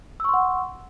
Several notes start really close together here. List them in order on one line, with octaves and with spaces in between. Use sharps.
E6 C#6 C6 F#5